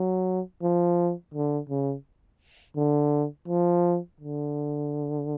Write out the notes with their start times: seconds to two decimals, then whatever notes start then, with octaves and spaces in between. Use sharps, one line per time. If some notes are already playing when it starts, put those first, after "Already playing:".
Already playing: F#3
0.62 F3
1.34 D3
1.69 C#3
2.76 D3
3.48 F3
4.20 D3